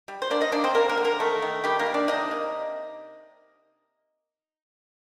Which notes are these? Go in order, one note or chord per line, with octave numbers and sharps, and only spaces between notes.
G3
C5
A#3 D4 D5
D#4 D#5
A#3 D4 D5
C4 C5
G3 A#3 A#4
A#3 A#4
D3
A#3 A#4
D#3 A3 A4
D#3
D#3 G3 G4
A#3 A#4
D#3
D4 D5
C3 D#4 D#5
A#3